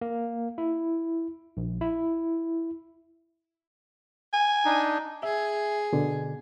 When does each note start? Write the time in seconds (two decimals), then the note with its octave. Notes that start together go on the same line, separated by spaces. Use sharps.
0.01 A#3
0.58 E4
1.57 A#1
1.81 E4
4.33 G#5
4.65 D4 D#4
5.23 G#4 E5
5.93 B2 D3